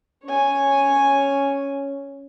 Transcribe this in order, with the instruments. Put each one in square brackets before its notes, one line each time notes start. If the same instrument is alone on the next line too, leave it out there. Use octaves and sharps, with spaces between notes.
[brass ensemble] C#4 [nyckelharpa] C#5 G#5